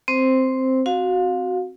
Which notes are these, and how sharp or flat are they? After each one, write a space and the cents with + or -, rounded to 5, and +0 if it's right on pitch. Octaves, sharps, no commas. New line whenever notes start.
C4 +0 C5 +0
C4 +0 F#4 +0 F5 +25